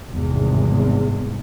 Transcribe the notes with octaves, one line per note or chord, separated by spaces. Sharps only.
G#1 E2 G2 C3 G#3